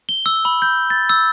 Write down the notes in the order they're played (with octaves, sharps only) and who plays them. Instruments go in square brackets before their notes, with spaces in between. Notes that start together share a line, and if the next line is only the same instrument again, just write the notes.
[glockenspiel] G7
E6
B5
G6
A6
E6